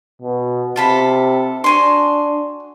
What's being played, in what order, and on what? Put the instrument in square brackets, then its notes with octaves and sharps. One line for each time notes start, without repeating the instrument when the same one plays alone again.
[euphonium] B2
[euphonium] C3 [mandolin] F4 A4 B5
[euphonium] D4 [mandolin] F#4 G#5 C6